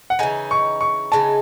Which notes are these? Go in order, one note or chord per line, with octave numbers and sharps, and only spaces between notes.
F#5
C#3 E3 G#3 D#4 G#5
C#6
C#6
C#3 E3 G#3 D#4 A5